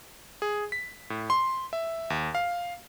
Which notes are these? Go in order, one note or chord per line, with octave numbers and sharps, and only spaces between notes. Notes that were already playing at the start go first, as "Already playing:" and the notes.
G#4
B6
A2
C6
E5
D#2
F5